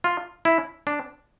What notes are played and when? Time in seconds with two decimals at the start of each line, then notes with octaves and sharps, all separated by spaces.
0.04 F4
0.45 E4
0.87 D4